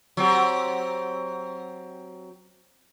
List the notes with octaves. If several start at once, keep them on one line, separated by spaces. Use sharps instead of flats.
F#3 C4 G4